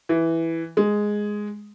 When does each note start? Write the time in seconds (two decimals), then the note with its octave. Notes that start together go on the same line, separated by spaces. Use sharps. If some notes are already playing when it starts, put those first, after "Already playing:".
0.09 E3
0.77 G#3